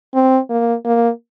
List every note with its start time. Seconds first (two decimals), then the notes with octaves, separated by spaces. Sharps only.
0.15 C4
0.50 A#3
0.85 A#3